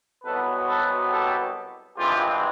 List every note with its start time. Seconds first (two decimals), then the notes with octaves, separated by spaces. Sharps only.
0.24 C2 B2 F#3 B3 A4 B4
0.68 A4 B4
1.11 G4 A4
1.98 G#1 G2 E3 G#3 C4 F4 G4